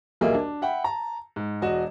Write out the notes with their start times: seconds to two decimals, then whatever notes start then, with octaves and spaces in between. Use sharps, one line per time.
0.21 D#1 B1 A#3 G#4 D#5 E5
0.35 D4
0.62 E5 F#5 G5 B5
0.84 A5 A#5
1.36 G#2
1.62 E1 F#4 D#5 E7